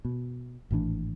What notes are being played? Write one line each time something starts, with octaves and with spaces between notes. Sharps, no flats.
B2
G#1 A2 E3 D4